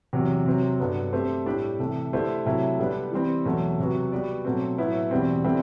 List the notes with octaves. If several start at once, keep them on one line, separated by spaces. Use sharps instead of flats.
E2 C3 F#3
C3 F#3 C4
G2 D3 F#3 B3
A3 C4 G4 C5
A2 G3 D4 G4 D5
C3 E3 A3
D3 A3 E4 G4 C5
C3 F#3 A3 E4
D3 G3 B3 D4
E3 G3 C4
E2 B2 F#3 A3
C3 F#3 B3 F#4
G3 B3 F#4 B4 D5
B2 F#3 A3 C4
A2 F#3 B3 E4
E2 B2 G3 C4
D3 G3 C4 E4